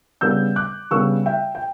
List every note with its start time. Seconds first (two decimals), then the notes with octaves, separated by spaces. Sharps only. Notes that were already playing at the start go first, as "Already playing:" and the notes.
0.21 C#3 G3 B3 D4 E6 G6
0.56 D6 F#6
0.91 C#3 G3 B3 D4 C#6 E6
1.26 E5 G5
1.55 G5